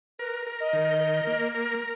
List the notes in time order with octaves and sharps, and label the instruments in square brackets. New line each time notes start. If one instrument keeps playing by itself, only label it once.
[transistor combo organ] A#4 [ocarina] B4
[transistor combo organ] A#4
[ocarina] D#5
[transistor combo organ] D#3
A#4
A#3
A#4